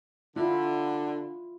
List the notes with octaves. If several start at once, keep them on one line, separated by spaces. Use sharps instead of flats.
D3 E4 F4